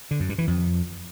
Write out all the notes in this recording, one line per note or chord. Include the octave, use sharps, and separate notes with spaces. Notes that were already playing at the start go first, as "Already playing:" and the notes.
D3
F#2
G2
E3
F2